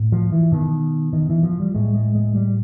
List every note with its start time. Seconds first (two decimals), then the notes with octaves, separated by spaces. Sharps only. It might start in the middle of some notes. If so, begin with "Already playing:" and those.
Already playing: A2
0.12 F3
0.31 E3
0.52 B2 D#3
1.13 D#3
1.29 E3
1.43 F3
1.60 G3
1.75 A2 G#3
1.95 G#3
2.15 G#3
2.35 G3